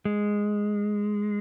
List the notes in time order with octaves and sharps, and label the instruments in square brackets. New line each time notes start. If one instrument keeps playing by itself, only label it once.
[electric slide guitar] G#3